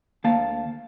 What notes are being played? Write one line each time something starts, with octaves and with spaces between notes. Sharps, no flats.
D2 A#3 F5 A5